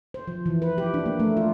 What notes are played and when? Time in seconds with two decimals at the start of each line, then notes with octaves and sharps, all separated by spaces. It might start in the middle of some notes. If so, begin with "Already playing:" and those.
0.14 C5
0.27 F3
0.46 E3
0.62 B4
0.78 G4
0.94 D4
1.06 A#3
1.20 A3
1.37 F4